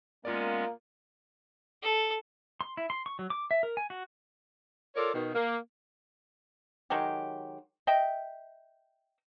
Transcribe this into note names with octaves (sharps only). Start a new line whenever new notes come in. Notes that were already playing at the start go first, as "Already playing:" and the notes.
G#3 A#3 B3 C#4 F4 A#4 D5
A4
C6
E4
C6
C#6
F#3
D6
E5
A#4
G#5
F#4
F4 A4 A#4 C#5 D5
B2 D#3
A#3
D#3 F#3 G#3 G4
D#5 E5 G5